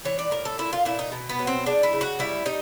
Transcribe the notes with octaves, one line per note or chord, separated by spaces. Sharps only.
E3 C#5
D5
A2 A#4
A4
A#2 E4
F4
A#2 E4
D#4
B2
B3
F#3
C4
G#3 D4
E4
C#3
F#4
G3 E4
G3 D#4